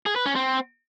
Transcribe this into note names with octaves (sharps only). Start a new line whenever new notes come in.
G#4
B4
C#4
C4